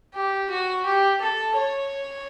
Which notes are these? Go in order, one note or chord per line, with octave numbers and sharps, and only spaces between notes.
G4
F#4
G4
A4
C#5